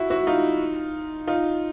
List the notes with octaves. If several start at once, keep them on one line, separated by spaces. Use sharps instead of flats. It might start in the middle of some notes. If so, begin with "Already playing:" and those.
Already playing: E4 F#4
E4 F#4
D#4 F4
D#4 F4